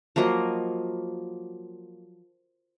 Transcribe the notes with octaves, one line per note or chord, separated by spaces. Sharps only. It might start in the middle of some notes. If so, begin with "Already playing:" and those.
F3 F#3 A#3 D#5